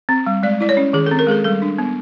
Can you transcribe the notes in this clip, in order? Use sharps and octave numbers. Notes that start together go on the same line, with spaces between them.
C4
G3
G#3 D5
E4 D5
C#5
C#4
D#3 G#4
C4 A4
A#4
G#3 G#4 A4
G3 A4
D4
B3